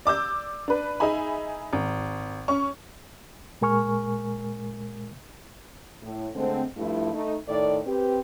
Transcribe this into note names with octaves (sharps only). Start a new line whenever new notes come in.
D5 D6 E6 G6
D4 B4
D#4 G#4 E5 G#5 B5
G#1
C#4 C#6
A#2 G#3 A#4 G#5 C#6 F6
A2
D3 G#3 A3 C4
G2 F3 A3 E4
A3 D#4
A2 D#3 A4 D5
C4 G4 B4